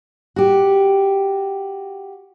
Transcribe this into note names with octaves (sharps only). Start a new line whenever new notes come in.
F#4 G4